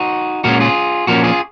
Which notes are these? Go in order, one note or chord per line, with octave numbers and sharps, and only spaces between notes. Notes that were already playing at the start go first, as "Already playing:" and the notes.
Already playing: D#4 F#4
A#2 G#3 C#4 F#4 A#4
F4 G#4
A#2 F3 A#3 C#4 F#4 A#4
F4 G#4